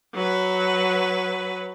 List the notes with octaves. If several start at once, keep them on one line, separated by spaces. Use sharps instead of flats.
F#3 B4